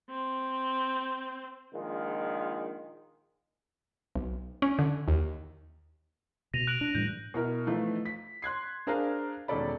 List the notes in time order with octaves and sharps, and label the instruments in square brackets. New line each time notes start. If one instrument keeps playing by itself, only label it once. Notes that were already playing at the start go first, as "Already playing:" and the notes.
[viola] C4
[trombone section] A#1 D#3 G#3 F4
[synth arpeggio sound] B1
C#4
D3
D#2
[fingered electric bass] B2 [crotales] A#6 D#7 F7
[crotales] F#6 D7 F#7
[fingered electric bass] D4
[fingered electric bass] A2 E3 G3 [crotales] G6
[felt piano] B2 E4 A#4
E3 F3 A3 D#4
B6
C6 F#6 G#6 C7
D4 G#4 A#4 C5 F5 A#5
E1 D#3 C#4 A4 D5 B5